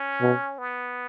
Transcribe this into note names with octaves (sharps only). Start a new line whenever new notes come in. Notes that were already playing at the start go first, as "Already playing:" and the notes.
Already playing: C#4
B2
B3